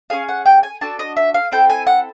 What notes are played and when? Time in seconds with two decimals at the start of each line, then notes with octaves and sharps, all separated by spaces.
0.10 C#4 F4 G#4 F5
0.29 F#5
0.46 G5
0.63 G#5
0.81 D4 F#4 A4 A5
0.99 D#5
1.17 E5
1.34 F5
1.51 C4 E4 A4 G5
1.70 G#5
1.87 F#5